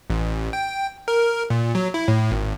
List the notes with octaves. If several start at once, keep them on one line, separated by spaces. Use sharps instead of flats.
A1
G5
A#4
A#2
F#3
E4
A2
G#1